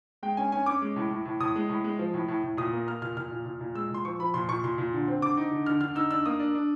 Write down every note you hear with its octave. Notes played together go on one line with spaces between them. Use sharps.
G#3 G5
C#4 G#5
C#4 G#5
C#4 D6
G#3
A2
A2
A2
A2 D#6
G#3
A2
G#3
F3
A2
A2
A2
A#2 D#6
A#3
A#3 F6
A#2 F6
A#2 F6
A#2
A#2
A#2
G#3 E6
A#2 C6
F3 C#6
F3 B5
A#2 C6
A#2 C#6
A#2 C6
A#2
D3
C4
D3 D6
D#4
D3
D3 F6
D3 F6
D#4 E6
D4 E6
A#3 D#6
D4
D4